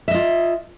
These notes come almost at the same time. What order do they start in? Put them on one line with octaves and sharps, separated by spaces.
E5 D#5 F4